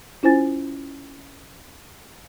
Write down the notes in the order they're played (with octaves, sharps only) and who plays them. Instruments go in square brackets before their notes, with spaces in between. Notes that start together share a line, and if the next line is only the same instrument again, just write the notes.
[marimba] C#4 E4 F4 C5 G#5 A6